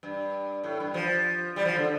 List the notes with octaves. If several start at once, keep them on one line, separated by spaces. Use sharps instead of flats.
G2
A2
G2
F3
G3
F3
D3